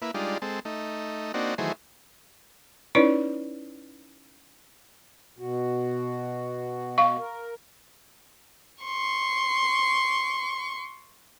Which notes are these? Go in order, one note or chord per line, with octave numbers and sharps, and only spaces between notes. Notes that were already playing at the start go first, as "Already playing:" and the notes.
A#3 E4 B4
G3 G#3 D4 D#4 F4
G#3 C4 A4
A3 D#4
A#3 C4 D4 D#4 F#4
D#3 E3 F#3 A3 G#4 C5
C#4 D#4 E4 B4 C#5 D5
B2 F#4
F5 C#6
A#4
C6 C#6